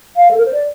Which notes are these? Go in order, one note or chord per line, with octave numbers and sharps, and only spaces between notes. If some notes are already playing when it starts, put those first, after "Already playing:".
F5
A4
A#4
C5
D5